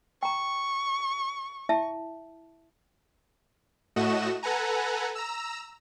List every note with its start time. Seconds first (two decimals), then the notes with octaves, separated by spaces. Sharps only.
0.23 G5 A#5 C#6
1.69 E4 E5 A5
3.96 A2 A3 F#4 D#5 E7
4.43 A4 B4 F#5 G#5 A#5
5.15 A#5 E6